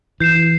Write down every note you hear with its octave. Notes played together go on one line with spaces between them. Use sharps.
E3 G6 C7 E7